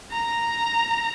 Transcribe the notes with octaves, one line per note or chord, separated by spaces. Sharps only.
A#5